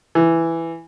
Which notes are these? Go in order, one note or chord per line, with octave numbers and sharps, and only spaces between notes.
E3